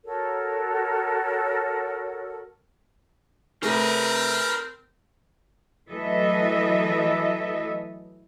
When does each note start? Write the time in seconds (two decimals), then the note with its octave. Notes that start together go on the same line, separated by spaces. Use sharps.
0.05 F#4 A4 A#4 C#5
3.63 C3 A3 C4 G#4 A#4 B4
5.89 E3 F#3 A3 A4 D#5 E5